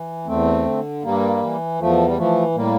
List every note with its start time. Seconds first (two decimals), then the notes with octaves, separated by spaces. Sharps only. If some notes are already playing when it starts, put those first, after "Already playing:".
Already playing: E3
0.27 E2 A3 C4
0.65 D3
1.03 G2 G3 A#3
1.41 E3
1.79 E2 F3 A3
2.06 G3
2.17 E3 F3 A3
2.55 A2 G3 A#3